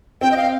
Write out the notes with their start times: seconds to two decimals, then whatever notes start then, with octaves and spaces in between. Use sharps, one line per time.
0.21 C4 G5
0.32 D#5
0.37 F5